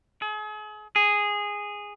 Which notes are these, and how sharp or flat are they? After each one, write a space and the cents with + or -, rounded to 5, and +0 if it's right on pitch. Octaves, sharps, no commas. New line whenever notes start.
G#4 +40
G#4 -10